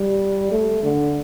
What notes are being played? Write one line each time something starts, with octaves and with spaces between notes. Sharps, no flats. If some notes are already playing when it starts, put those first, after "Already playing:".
Already playing: G3
A3
D3